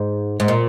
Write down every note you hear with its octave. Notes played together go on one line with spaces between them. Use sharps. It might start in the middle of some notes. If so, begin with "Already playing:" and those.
Already playing: G#2
G#2
A#2